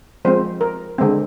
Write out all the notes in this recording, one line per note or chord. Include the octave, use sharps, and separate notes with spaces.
F3 G#3 C4 C5
A#4
D3 G#3 C4